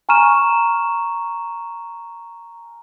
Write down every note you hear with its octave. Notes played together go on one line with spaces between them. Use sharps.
G#5 A#5 C#6 F6 D#7 E7